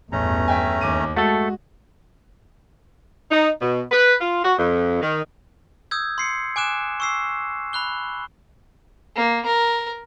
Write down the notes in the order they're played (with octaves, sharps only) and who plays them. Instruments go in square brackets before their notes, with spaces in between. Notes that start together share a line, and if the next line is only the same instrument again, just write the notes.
[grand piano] A1 [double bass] E2 G2 [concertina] A3 C#4 A#5
[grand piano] E5 G5 G#5
D#2 D6 D#7
[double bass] G#3 [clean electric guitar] A3 A4 [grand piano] F#4
[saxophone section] D#4
B2
B4
F4
F#4
F2
D#3
[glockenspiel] D#6 E6 G6 G#6
C6 C7 C#7
G#5 D6 F#6 E7
C#6 E6 C7
B5 F#6 G7
[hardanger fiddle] A#3
A#4